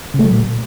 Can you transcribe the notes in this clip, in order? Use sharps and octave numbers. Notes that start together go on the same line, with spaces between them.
C#3
A3
F#3
A#2